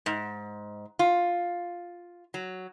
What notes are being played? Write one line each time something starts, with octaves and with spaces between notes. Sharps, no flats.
G#2
F4
F#3